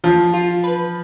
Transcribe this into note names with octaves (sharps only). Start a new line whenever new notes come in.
F3 F4
F4
B4